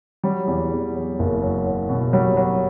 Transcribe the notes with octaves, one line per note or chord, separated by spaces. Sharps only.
F#3 G3
E2
E2
F#3
F#1
F#3
F#3
B2
F#3 G3
F#3